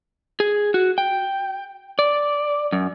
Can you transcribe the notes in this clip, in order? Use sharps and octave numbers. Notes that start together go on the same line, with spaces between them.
G#4
F#4
G5
D5
F#2